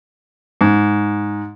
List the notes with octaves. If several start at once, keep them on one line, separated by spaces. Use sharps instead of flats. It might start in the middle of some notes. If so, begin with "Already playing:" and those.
G#2